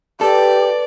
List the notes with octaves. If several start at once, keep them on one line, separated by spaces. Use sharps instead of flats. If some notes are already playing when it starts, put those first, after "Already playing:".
G4 A4 B4 D5 A6